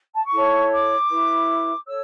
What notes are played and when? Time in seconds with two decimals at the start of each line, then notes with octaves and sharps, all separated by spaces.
0.13 A5
0.22 C#6
0.31 E4 A4 C#5
0.71 D6
1.09 E4 B4
1.85 A4 C#5 E6